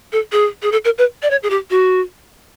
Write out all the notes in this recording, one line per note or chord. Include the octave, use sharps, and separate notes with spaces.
A4
G#4
G#4
A4
A#4
B4
D5
C#5
G#4
G4
F#4